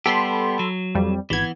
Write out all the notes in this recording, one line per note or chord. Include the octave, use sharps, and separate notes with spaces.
G3 B3 G4 A4 B5 C6
F#3
F2 G3
G#1 E3 B3 G#6